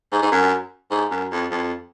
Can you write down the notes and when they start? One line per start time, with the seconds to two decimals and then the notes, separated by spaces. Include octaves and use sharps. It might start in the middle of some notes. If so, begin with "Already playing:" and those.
0.12 G#2
0.22 G#2
0.31 F#2
0.91 G#2
1.11 F#2
1.32 F2
1.51 F2